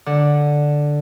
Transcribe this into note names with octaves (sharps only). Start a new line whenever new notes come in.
D3